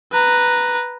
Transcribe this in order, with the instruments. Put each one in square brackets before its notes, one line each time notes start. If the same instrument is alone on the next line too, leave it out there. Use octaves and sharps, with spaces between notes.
[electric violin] B4 A#5